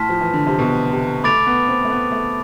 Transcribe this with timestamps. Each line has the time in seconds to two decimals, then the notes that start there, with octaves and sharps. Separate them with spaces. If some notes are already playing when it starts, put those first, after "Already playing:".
Already playing: A2 A5 C6 F6 B6
0.09 F3
0.21 E3
0.34 D3
0.47 C3
0.59 B2
0.91 C3
1.24 A3 B5 D6 A6 D7 F7
1.46 B3
1.68 C4
1.85 A3
1.90 B3
2.12 A3